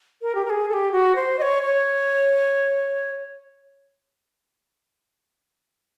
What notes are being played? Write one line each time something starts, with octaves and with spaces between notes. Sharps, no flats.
A#4
G4
A#4
G#4
A4
G4
F#4
C5
D#5
C#5
C#5